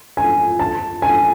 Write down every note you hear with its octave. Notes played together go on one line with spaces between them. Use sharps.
G#5
A5
G#5